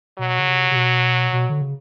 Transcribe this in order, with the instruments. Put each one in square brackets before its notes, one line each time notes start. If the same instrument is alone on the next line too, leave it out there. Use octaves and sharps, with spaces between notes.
[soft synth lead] B2 [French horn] F#3
[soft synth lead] C#3
C3
C3
B2
B2
D3
C#3